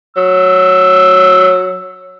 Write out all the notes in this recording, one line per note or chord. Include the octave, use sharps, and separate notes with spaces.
F#3 E6